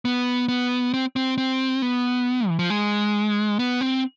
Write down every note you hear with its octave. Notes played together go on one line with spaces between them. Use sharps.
B3
B3
C4
C4
C4
B3
E3
F3
G#3
B3
C4